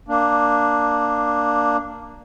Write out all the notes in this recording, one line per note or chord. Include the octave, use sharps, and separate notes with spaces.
A#3 D4